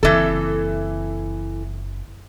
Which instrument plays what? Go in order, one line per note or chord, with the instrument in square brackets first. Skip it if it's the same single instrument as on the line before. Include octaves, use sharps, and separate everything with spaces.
[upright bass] F#1 C4 [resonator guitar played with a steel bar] E3 A4